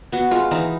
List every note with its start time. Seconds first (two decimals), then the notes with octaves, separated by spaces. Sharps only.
0.12 B3 F#4
0.31 G#3 F4
0.51 E3 D#4